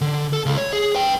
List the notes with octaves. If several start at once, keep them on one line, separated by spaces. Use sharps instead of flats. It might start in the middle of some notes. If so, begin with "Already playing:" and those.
D3
A4
C#2
C#5
G#4
B4 G5